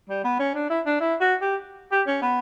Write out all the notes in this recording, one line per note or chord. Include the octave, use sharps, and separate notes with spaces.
G3
B3
C#4
D4
E4
D4
E4
F#4
G4
G4
C#4
B3